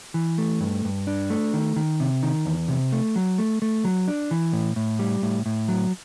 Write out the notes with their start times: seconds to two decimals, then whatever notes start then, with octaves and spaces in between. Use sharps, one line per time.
0.14 E3
0.38 A3
0.60 G2
0.85 G2
1.07 D4
1.30 A3
1.53 D#3
1.76 D#3
2.00 C3
2.23 D#3
2.46 E2
2.68 C3
2.93 A3
3.16 F#3
3.38 A3
3.62 A3
3.85 F#3
4.08 D4
4.31 E3
4.53 A2
4.76 A2
4.99 G3
5.22 A2
5.46 A2
5.68 F#3